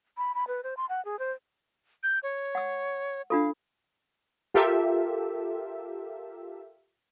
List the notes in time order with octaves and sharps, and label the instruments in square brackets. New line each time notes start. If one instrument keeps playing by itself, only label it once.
[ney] B5
B5
B4
C5
C6
F#5
G#4
C5
[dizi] G6
C#5
[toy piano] F#5 E6
[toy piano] D4 F4 A4 [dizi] F5
[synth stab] F4 G4 A4 A#4 E5